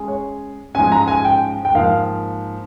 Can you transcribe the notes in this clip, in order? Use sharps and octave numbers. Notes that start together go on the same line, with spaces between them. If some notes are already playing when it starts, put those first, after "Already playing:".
Already playing: G#3 C#4 G#4
C#5
G#2 F3 G#3 C#4 G#5
A#5
G#5
G5
G5
G#2 F3 A#3 F5